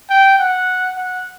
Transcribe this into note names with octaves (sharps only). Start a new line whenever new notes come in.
G5
F#5
F#5